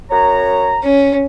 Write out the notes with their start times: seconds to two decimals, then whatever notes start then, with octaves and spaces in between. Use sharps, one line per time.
0.10 F#2 C#5 A#5
0.83 C#4